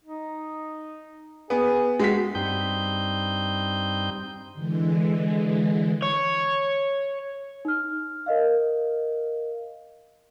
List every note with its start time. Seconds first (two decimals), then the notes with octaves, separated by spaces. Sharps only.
0.04 D#4
1.50 B3 G#4
1.99 G#3 C4 F#4 B6
2.35 G2 G3 C4 D#4 G6
4.54 D3 E3 G#3
6.02 C#5
7.65 D#4 F6
8.26 A#4 D#5 F5